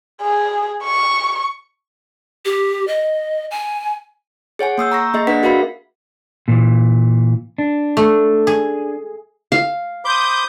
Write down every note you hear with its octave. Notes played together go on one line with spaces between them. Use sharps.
G#4
C#6
G4
D#5
G#5
G#4 C#5 F#5 G#5
A#3 D#6 E6 G6
A#5 C#6 A#6
A#3 G#4 D#5 E5
D4 B4 F#5 B6
F#4 G#4 A#4 E5 F5 B5
A#2 E3
D4
A3
G#4
F5
C5 B5 D6 D#6 G6